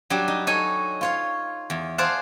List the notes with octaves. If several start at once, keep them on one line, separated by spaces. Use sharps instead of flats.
F#3 G3 D4 G4
D#4
D#4 A4 C#5 G#5
F4 C#5 F5
E2
G#4 C5 D5 F5 F#5 A5